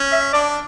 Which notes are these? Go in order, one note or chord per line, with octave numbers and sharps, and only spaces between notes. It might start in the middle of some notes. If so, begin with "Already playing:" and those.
Already playing: C#4
E5
D4 D5